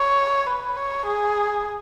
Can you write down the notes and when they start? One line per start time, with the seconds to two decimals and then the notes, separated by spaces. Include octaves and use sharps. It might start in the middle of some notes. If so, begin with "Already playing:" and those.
Already playing: C#5
0.47 B4
0.77 C#5
1.06 G#4